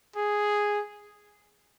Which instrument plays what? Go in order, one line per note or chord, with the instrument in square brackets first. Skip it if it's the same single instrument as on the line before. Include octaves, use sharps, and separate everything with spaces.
[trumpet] G#4